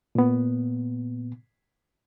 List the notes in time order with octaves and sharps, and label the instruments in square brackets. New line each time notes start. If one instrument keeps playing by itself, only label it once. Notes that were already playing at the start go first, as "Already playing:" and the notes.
[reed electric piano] A#2 B3